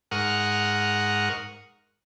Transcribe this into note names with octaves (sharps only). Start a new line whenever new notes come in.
G#2 A#4 F#5 C#6 D#6 F6